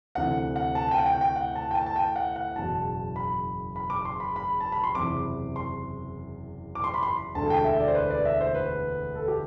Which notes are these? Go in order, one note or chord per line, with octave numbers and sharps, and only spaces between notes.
D2 C3 E3 F#5
F#5
A5
G5
F#5
G5
G5
F#5
A5
G5
A5
A5
G5
F#5
F#5
F#1 E2 B2 A5
B5
B5
D6
C6
B5
B5
A5
B5
C6
F#1 E2 C3 E3 D6
C6
D6
C6
B5
C6
E1 D2 D3 A5
G5
E5
D5
C5
B4
D5
E5
C5
B4
A4
G4